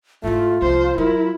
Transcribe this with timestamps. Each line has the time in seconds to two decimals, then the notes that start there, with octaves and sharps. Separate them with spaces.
0.24 G#2 A3 E4 F4
0.62 C2 F3 C5
0.98 F#3 E4 A#4